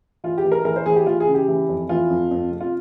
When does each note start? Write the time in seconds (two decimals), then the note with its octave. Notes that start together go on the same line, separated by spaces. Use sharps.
0.24 E3 F4
0.38 G4
0.45 E3
0.52 A#4
0.65 E3 A#4
0.76 C5
0.86 E3 G#4
0.96 G4
1.06 E3 F4
1.20 G#4
1.27 C#3
1.34 G4
1.48 E3
1.69 F2
1.89 E3 F4
2.10 F2
2.31 F2
2.51 C3
2.61 F4